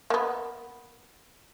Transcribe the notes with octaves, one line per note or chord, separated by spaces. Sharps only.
A#3 B3